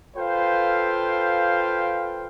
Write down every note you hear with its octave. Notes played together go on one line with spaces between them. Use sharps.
F4 A4 B4 C5 F5 G5